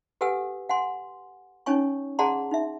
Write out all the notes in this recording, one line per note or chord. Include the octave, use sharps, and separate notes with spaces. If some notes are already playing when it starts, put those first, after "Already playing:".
G4 A4 B4 F#5 G#5 E6
F#5 G#5 C6
C#4 D#4 C#5 G#5 C#6
G#4 D5 F#5 A5 A#5 C6
D#4 E5